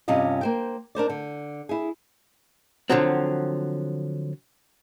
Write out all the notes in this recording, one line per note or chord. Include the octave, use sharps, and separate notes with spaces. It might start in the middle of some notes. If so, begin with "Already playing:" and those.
G2 C3 C#4 F4 D#5
A#3 C5 G5
D4 A#4 C5 D5
D3
E4 G#4
D3 F3 F#3 C4